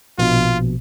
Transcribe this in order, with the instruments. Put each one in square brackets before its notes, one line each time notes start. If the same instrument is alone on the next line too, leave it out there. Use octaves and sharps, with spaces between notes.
[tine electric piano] A#1 B2 [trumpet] F4